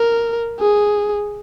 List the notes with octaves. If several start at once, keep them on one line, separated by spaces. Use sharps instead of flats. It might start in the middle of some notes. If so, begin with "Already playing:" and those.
Already playing: A#4
G#4